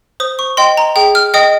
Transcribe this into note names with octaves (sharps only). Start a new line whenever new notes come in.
C5 D#6
C#6
D#5 G5 C6
A#5
G#4 G5
F6
D#5 G5 D#6